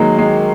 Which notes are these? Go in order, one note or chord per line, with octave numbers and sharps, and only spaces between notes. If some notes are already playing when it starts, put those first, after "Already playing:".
Already playing: D#3 F#3 G#3 A#3
G#3